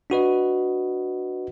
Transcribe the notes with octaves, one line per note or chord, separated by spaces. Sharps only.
D4 F#4 B4 D#5